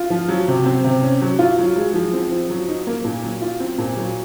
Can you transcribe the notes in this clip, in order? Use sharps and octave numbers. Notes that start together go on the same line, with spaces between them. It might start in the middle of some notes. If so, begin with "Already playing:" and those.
Already playing: F4
F3
F#3
C3
C4
C3
C#4
F#3
F4
F#3
G#3
F3
C4
F3
F#3
D#4
A#3
A#2
F#3
F4
C4
A#2
F#3